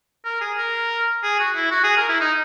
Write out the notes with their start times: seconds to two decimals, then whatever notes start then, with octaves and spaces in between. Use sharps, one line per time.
0.25 A#4
0.41 G#4
0.58 A#4
1.23 G#4
1.39 F#4
1.56 E4
1.71 F#4
1.83 G#4
1.97 A#4
2.09 E4
2.21 D#4